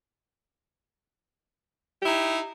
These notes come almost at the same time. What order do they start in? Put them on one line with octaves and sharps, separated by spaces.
G4 E4 D#4